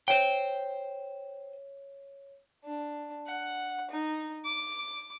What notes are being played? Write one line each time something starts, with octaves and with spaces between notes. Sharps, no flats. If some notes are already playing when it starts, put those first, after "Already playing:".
C5 C#5 G5
D4
F#5
D#4
D6